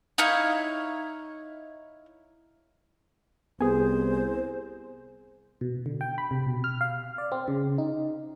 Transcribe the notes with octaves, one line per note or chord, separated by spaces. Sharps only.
D#4 E4 C#5 F5
C2 B3 G#4 C5 G#5
B2
D3
G5
B5
C3
B2
F6
F5
D5
C4
C#3
D#4